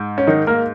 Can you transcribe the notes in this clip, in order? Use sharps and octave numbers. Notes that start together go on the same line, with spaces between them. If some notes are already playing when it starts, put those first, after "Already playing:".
Already playing: G#2
C#4
D#3 D#4
A#3 A#4